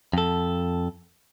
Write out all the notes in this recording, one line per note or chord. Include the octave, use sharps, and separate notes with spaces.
F2 A4